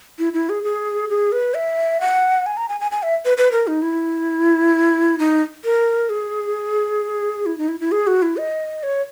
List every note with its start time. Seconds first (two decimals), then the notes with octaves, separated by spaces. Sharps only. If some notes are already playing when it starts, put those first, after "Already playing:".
0.19 E4
0.33 E4
0.49 G#4
0.64 G#4
1.09 G#4
1.32 B4
1.54 E5
2.01 F#5
2.46 G#5
2.57 A#5
2.69 G#5
2.80 G#5
2.91 G#5
3.03 E5
3.25 B4
3.37 B4
3.52 A#4
3.67 D#4
3.82 E4
5.19 D#4
5.64 A#4
6.10 G#4
7.46 E4
7.58 D#4
7.69 E4
7.80 E4
7.92 G#4
8.07 F#4
8.22 E4
8.37 D#5
8.83 C#5